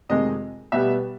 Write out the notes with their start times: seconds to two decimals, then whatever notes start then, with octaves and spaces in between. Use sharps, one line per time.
0.09 F2 C3 D#3 G#3 D#5
0.72 B2 G3 B3 E5